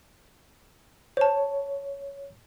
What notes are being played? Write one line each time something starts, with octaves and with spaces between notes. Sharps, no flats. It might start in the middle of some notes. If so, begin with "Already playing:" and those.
C5 C#5 A5